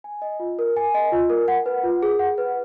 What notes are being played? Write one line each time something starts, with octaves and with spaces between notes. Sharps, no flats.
G#5
D#5
F4
A#4
G#5
D#5
F4
A#4
F#5
B4
F4
G#4
F#5
B4